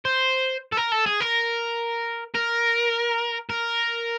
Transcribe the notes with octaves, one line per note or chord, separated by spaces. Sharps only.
C5
A4
A#4
A4
G#4
A#4
A#4
A#4